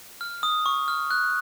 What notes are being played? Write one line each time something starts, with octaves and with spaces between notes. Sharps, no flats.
F6
D#6
C#6
F6
F#6